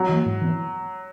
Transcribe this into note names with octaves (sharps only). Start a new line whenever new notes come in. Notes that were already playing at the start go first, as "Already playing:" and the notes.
Already playing: F#3
E3 A#3
G#2
E3 B3